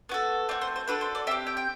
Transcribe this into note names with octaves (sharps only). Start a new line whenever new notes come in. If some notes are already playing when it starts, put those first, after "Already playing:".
B3 F#4 A4
A3 C4 F#4 D5
C5
C5
D4 F#4 A4 B4
C5
D5
C4 G4 E5
G5
G5